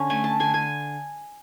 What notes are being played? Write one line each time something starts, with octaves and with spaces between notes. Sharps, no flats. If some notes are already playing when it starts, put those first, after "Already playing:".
Already playing: D3 C#4
A3 G#5
A5
D3 G#5
G#5